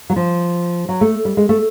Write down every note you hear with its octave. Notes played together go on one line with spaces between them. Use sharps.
F#3
F3
F#3
A3
G3
G#3
A3